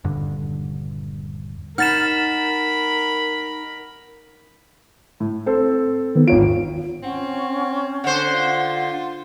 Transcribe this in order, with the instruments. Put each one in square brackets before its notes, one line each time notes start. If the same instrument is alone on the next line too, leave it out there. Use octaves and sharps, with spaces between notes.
[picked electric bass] D#1 G2 D3
[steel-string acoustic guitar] D#4 [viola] A#4 B5 [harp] F#5 [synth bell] F6 A6 E7
[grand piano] A2
C4 A4 C5
[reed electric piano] D#3 B3
[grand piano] G#1 C#5 D7 [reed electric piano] F4
[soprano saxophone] C4 [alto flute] C#4 [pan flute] F#5
[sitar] D3 C5 [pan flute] F#5
[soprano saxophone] F4